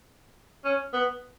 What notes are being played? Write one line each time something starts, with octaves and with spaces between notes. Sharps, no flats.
C#4
B3